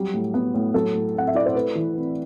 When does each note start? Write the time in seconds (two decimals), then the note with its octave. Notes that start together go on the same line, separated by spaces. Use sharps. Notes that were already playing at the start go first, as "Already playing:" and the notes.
Already playing: F#3 G3
0.14 A2
0.34 B3
0.54 A2
0.74 F#3 A4
0.94 A2
1.15 C4 F#5
1.27 E5
1.35 E4 D5
1.46 C5
1.55 A3 B4
1.75 E3
1.96 C4